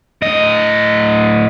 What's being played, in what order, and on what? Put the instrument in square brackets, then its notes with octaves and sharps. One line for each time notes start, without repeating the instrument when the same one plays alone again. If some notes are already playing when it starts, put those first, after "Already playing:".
[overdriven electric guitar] A2 D#5